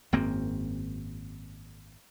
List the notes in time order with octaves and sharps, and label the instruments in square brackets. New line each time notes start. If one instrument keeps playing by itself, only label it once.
[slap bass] G#1 F#2 A#3 C4